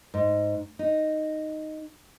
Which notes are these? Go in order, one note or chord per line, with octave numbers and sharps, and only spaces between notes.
G#2
D#4